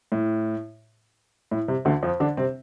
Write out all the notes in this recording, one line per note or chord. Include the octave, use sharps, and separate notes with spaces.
A2
A2
C3
D2 D3
F2 F3
D3 D4
C3 C4